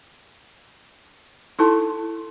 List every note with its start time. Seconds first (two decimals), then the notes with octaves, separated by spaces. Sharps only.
1.59 D#4 E4 A4 A5 C6